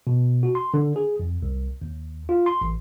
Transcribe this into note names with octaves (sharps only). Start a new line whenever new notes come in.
B2
F#4
C6
D3
G#4
F2
C2
D#2
F4
C6
A1